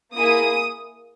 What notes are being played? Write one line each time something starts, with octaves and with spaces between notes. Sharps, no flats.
A#3 E4 G#4 D#6